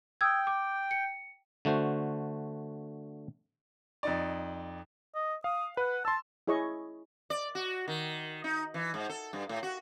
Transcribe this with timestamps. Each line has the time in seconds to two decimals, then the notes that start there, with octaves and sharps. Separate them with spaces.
0.21 G5 D#6 E6 G#6
0.47 D6
0.91 C#7
1.65 D3 A3 F#4 C5
4.03 F2 D#4 D5
5.15 D#5
5.44 F5 D#6
5.77 B4 F#5
6.05 A5 C6 E6
6.47 E4 G#4 C#5 D#5 C#6
7.30 D5
7.55 F#4
7.88 D#3
8.44 D#4
8.74 E3
8.94 G#2
9.09 A4
9.33 G2
9.49 A2
9.63 F#4